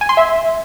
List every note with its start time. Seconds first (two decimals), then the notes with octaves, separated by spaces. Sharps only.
0.01 G#5
0.09 C6
0.17 E5